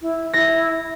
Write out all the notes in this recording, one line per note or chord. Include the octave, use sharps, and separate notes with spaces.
E4
E4 A#6